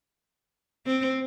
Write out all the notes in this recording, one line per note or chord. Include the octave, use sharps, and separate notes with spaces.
C4